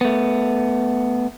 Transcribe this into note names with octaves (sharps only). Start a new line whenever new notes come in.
A3 B3